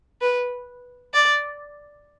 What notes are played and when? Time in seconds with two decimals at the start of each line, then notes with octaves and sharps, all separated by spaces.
0.21 B4
1.14 D5